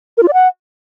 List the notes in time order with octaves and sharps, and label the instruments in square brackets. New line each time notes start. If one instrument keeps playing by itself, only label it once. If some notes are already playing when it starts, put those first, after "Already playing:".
[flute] A#4
F4
D5
F#5